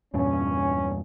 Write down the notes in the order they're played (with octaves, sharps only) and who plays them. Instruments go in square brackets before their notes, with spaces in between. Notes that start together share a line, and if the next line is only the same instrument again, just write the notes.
[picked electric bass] E2 G2 A#2 [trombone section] C#4